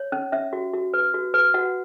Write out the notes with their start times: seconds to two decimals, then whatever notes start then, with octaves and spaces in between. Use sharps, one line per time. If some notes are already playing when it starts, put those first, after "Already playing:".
Already playing: C#5
0.12 C#4
0.32 C#4 E5
0.53 F#4
0.73 F#4
0.93 B4
1.14 F#4
1.34 B4
1.54 F#4 F#5